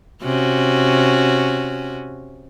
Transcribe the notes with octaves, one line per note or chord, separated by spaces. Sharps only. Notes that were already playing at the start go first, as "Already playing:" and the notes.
C3 C#4 F#4